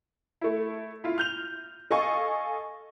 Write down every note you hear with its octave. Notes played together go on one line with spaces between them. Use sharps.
A3 E4
E4 F4
F6 G6 F7
A4 D#5 F5 G#5 C#6